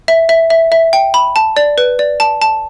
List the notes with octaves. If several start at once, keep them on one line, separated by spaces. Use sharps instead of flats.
E5
E5
E5
E5
G5
B5
A5
D5
B4
D5
A5
A5